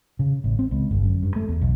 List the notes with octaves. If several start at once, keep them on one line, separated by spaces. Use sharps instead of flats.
C#3
A1
C4
C#2
G1
F#2
G2
A3
E2
B1